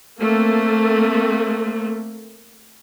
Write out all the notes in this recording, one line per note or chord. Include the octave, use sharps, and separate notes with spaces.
A3 A#3 C4